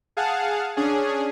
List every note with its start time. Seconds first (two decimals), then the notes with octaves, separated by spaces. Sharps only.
0.17 G#4 F5 F#5 A5
0.77 C#4 D4 G#4